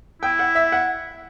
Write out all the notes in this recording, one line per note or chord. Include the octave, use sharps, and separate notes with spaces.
E4 G5
F#5
E5
F#5